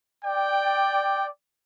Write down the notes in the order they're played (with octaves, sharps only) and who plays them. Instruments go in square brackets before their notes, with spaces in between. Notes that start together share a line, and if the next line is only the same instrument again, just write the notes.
[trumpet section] D5 G5